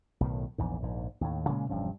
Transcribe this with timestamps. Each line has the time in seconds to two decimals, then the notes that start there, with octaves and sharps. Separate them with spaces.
0.21 B1 A2 D#3
0.58 A#1 E2 G#2
0.82 A#1 G#2
1.21 D#2 A2
1.48 A#2 C#3 G#3 A#3
1.69 E1 G2 F3 C#4